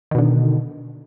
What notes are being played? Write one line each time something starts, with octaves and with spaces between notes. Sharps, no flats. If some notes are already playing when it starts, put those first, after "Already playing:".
B2 D3 D#3